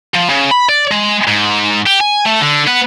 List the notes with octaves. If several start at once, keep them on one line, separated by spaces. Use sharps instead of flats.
F3
C#3
B5
D5
G#3
G#2
G4
G#5
A3
D3
B3